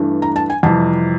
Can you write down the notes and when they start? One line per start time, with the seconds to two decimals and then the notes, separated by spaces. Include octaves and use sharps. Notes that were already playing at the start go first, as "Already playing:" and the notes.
Already playing: G2 E3 A3 D4
0.22 A#5
0.36 A5
0.50 G#5
0.63 F2 C3 E3 G3 A5